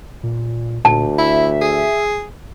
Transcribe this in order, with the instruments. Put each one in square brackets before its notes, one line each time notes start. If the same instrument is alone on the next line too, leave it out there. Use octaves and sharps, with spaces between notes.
[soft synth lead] A#2
[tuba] D2 [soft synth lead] A#2 [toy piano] A5
[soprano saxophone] E4 [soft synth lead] E5
[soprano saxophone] G#4